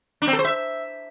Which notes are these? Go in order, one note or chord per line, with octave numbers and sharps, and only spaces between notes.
D4
C4
A4
C5
E5